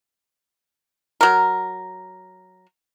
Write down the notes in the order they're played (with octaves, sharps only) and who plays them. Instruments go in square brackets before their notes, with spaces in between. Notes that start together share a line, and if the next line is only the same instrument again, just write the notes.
[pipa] F#3 A#4